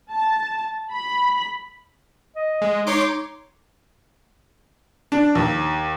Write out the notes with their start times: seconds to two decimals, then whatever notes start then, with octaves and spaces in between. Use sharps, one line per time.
0.11 A5
0.91 B5
2.36 D#5
2.62 G#3
2.87 D#4 C#5 C6 D6
5.12 D4
5.35 D#2